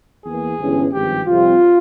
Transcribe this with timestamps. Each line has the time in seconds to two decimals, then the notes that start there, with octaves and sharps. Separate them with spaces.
0.25 E2 E3 A#3 G#4
0.60 G1 G2 E3 G#3 C#4
0.93 G#1 G2 F3 G4
1.27 F2 C3 G3 C4 F4